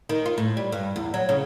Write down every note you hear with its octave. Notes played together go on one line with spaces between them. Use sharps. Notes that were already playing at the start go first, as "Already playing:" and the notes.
D#3
F4
A2
G3
G2
E2
F#3
C#3